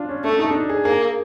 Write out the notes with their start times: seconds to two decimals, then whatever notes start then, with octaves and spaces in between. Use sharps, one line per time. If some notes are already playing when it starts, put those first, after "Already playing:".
Already playing: D4 F4
0.09 C#4
0.24 A3 D4
0.39 D#4
0.50 D4
0.55 D#4
0.69 G#4
0.85 A#3 G#4